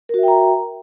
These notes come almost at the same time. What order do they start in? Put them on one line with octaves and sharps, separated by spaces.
A#4 F#4 E5 G5 A#5